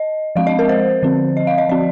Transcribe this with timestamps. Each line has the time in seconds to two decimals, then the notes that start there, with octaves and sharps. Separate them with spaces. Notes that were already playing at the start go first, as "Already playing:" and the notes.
Already playing: D#5
0.36 F3 G#3 C4 F5
0.47 D#5
0.59 A#4
0.69 C5
1.02 D3 F3 C4
1.37 D#5
1.47 F5
1.58 D#5
1.69 F3 C4 D5